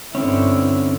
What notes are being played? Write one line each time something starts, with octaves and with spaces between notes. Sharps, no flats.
G1 D3 C4 C#4 E4